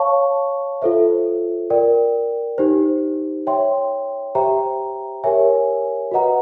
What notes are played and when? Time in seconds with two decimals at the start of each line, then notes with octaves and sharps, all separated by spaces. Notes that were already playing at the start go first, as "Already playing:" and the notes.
Already playing: C#5 F5 A5 C#6
0.82 F4 A4 C5 E5
1.70 A#4 D5 G5
2.58 D#4 G4 C5
3.47 C#5 E5 G5 C6
4.35 G4 C5 E5 G5 A#5
5.24 G4 A#4 C#5 E5 G#5
6.11 F#4 B4 D#5 F#5 A#5